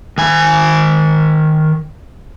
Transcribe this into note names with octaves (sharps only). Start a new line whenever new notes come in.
D#3 G#5